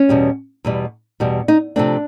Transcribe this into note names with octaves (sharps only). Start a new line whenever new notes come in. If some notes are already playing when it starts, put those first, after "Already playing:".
Already playing: C#4
E2 B2 G3
E2 B2 G3
E2 B2 G3
D#4
C3 F3 A3 C4 D4